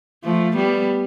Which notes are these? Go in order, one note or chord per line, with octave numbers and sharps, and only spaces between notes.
F3 A3
G3 B3